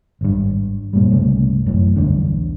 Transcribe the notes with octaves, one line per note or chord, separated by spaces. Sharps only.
G#1 G2
G2 A#2 G3
C2 G2 C#3 A3
A1 F#2 A2
B1 E2 G2 D3